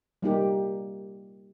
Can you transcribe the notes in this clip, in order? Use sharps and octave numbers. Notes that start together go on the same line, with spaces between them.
G3 A#3 D#4 G4